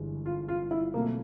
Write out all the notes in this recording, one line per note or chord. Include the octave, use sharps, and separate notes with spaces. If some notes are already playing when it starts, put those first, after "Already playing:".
Already playing: G1 G2 E3 G#3
F4
F4
E4
B2 F#3 A3 A#3 C4 E4